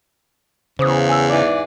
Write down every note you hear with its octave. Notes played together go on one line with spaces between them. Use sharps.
E2 C#3 C5 D6 D#6
G#5 E6
G#2 E3 D5